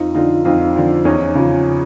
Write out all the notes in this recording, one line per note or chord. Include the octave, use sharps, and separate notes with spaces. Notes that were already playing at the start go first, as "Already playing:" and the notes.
Already playing: F2 D#4 F4
D3 F3 D#4 F4
F2 D#4 F4
D3 F3
E2 C#4 D#4
C#3 F3